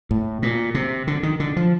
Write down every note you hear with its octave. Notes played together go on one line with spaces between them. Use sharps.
A2
A#2
C3
D3
D#3
D3
F3